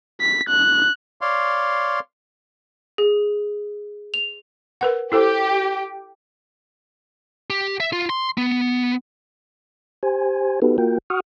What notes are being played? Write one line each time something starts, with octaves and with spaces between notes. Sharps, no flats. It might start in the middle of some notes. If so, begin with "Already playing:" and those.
B6
F#6
C#5 D5 F5 C6
G#4
F7
A#4 B4 F#5
E4 G4 A4 C5
G4
E5
F4
C6
B3
G4 C5 G#5
B3 D#4 F#4 G4 A4 B4
A#3 F4 F#4 A#4 G5
F#4 F#5 C#6 D#6 F6